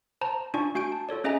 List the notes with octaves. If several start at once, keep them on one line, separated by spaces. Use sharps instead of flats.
C5 A5 A#5
D4 F4 D5 G#5 C#6
A3 F#4 G#5 G6 D7
A5
F4 A4 C#5 D5
C#4 G#4 D#5 E5 G#5 A#5